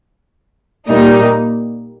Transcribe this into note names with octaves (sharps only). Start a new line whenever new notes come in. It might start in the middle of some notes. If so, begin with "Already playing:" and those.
A#2 G3 A#3 D#4